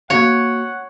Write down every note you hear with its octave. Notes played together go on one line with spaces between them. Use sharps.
A#3 F#4 C#5 F5 F#5